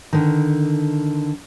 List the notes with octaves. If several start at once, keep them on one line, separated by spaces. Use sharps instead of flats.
D3 D#3